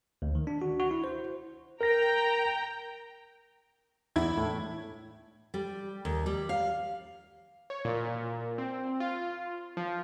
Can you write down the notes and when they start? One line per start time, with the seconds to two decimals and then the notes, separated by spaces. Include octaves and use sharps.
0.22 D2
0.35 D#3
0.47 D4
0.62 F#4
0.80 F#4
0.91 E4
1.04 C5
1.81 A#4 G5 A#5 A#6
4.16 E2 E4 G#6
4.38 A2
5.54 G3
6.05 D#2
6.26 G3
6.49 F5
7.70 C#5
7.85 A#2
8.58 C4
9.00 F4
9.77 F3